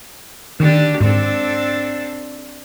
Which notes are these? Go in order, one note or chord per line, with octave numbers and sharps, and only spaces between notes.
D3 D#3 D4 G4
G#2 C4 D4 A4